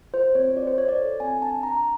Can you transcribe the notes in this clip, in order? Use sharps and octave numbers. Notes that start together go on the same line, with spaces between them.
F4 C5
C4 C#5
F4 D5
C5
F4 C#5
D5
A4
C4 G#5
D4 A5
D4 A#5